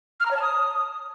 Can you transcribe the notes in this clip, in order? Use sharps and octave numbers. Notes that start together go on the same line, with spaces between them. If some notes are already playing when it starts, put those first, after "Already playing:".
F6
A#5
C#5
A5
D#6